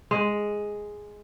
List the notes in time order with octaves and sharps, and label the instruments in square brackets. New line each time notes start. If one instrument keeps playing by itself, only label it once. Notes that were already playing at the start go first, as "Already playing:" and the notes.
[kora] G#3